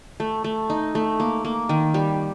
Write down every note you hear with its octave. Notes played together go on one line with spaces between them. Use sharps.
A3
A3
D#4
A3
A#3
A#3
D#3
G3